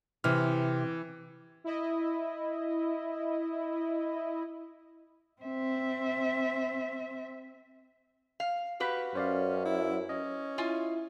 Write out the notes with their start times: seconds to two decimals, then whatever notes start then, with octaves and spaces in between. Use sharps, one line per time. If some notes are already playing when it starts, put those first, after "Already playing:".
0.24 C3 E3 F6
1.64 E4 D#5
5.42 C4 E5
8.40 F5
8.80 F#4 G4 B4 F5 B5
9.15 F#2 C#4 C5 D5 F5
9.66 E4
10.09 C#4 D#5
10.58 E4 F4 G#5